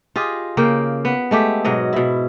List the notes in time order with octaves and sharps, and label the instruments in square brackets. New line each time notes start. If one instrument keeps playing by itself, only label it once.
[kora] F4 G4 G#4 D#5
C#3 A#3 G5
B3
G#3 A3 G4
G#2 B2 F#3 D#5
B2 E4